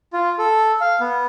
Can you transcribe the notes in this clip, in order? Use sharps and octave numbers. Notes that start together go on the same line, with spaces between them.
F4
A4
F5
B3